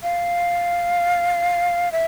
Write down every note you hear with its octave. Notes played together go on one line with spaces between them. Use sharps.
F5
E5